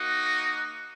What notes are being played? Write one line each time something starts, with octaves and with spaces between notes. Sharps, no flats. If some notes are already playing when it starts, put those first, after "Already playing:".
Already playing: A#3 D#4 F#4